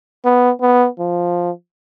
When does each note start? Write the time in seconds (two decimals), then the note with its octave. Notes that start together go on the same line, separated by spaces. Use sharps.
0.25 B3
0.61 B3
0.99 F3